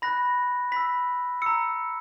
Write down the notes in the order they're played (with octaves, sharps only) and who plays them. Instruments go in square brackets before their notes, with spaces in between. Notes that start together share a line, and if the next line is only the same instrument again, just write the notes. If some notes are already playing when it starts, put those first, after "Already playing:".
[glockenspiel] B5 F#6 A#6
B5 E6 B6
A#5 E6 C#7